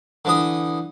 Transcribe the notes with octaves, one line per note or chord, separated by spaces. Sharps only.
D3 E3 D#6